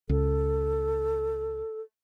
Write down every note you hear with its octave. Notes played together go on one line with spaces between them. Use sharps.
C#2 A4